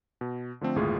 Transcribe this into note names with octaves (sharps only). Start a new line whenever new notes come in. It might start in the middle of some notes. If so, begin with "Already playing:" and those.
B2
D3 F3 A3 C4
G1 D#2 A2 G#3 F4 G#4